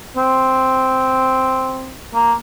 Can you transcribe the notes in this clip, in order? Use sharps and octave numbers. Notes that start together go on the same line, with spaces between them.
C4
A#3